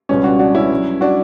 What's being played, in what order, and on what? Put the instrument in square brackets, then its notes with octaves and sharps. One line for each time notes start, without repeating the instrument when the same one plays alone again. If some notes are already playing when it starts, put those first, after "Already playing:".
[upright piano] C#2 B2 G3 C#4
D4 F#4
D4 F#4
C#4 E4
G2 F#3
D4 F#4